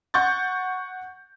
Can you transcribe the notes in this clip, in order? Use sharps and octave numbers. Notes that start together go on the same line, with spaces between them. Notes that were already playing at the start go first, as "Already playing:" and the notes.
F#5 C#6 G6 A6